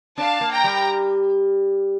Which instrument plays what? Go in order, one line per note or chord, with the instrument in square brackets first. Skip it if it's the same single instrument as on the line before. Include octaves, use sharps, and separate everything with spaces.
[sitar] D4 [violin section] F5 A5
[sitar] A#3
[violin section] G5 A#5
[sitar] G3